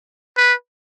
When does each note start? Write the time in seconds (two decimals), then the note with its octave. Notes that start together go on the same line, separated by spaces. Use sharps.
0.37 B4